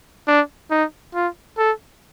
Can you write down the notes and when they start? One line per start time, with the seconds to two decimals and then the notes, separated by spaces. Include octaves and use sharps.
0.28 D4
0.71 D#4
1.14 F4
1.58 A4